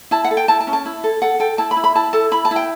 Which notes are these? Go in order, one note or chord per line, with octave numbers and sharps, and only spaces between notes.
E4 A5
F#5
A4
G5
E4 A5
A5
C#4
A5
E4
A4
A4 F#5
A4 G5
E4 A5
B5
E4
B5
E4 A5
A4 A5
E4 B5
A5
E4 G5